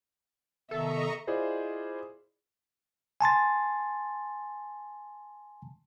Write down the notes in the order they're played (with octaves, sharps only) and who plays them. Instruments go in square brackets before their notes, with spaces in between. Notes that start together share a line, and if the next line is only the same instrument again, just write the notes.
[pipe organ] C3 D#3 B3 [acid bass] A4 [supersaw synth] D#5 A#5 C#6 [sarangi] E5
[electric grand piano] E4 F4 G#4 C5 D5 D#5
[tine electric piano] G#5 A5 C6 A6